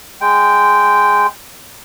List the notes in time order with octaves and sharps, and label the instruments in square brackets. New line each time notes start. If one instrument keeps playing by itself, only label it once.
[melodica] G#3 G5